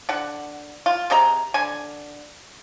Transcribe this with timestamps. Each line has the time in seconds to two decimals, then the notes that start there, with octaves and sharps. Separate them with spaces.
0.09 D3 F#5
0.86 F4
1.10 C3 G#4 D#5 A#5
1.54 D3 G#5